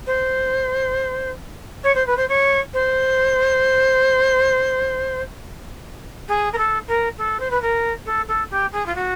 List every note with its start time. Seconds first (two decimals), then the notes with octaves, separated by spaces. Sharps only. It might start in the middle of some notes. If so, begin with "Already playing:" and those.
0.06 C5
1.84 C#5
1.95 C5
2.06 B4
2.17 C5
2.29 C#5
2.73 C5
6.28 G#4
6.53 A#4
6.58 A4
6.88 A#4
7.18 A4
7.40 C5
7.50 B4
7.62 A#4
8.06 A4
8.28 A4
8.50 G4
8.72 G#4
8.86 F4
8.95 F#4